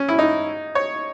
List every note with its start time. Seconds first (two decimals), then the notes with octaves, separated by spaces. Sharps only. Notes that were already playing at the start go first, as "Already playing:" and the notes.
Already playing: C#4
0.09 E4
0.19 D#4
0.75 C#5